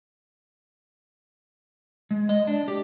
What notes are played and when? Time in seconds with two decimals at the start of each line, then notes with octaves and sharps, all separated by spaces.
2.11 G#3
2.29 D#5
2.47 D4
2.68 G4